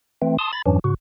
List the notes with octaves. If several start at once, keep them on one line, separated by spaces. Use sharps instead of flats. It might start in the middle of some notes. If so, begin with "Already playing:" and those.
E3 A3 C4
A5 C6 D#6
B5 A6
F2 G#2 E3 F#3 C#4 D4
G#2 C#3 F#4